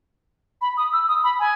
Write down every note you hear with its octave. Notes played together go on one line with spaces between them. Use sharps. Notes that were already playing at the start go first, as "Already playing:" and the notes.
B5
D#6
E6
D#6
B5
G#5